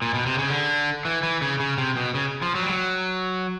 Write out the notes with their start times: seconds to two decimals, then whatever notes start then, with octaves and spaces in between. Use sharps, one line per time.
0.02 A#2
0.14 B2
0.26 C3
0.38 C#3
0.50 D3
1.05 E3
1.23 E3
1.41 C#3
1.60 C#3
1.78 C3
1.97 B2
2.15 C#3
2.42 F3
2.55 F#3
2.63 G3
2.69 F#3